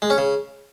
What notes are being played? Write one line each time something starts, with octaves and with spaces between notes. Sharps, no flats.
G#3
C#4
C#3